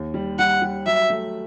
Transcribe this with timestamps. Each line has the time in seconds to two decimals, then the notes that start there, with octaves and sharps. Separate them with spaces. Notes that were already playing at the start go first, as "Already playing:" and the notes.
Already playing: D#2
0.14 G3
0.39 G3 F#5
0.62 G3
0.86 F#3 E5
1.10 A3